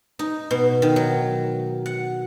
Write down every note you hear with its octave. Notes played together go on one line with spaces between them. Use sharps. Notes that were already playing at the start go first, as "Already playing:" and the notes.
D#4
B2
D#3
F#3
F#5